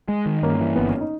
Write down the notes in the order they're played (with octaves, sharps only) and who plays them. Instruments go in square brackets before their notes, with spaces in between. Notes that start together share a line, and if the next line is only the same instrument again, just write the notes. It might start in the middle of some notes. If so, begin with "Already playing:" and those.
[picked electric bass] G#3
D#3
[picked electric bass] G2 [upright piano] A#3 C#4
[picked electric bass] E3
[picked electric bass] G1 [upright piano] B3
[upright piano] C#4
D#4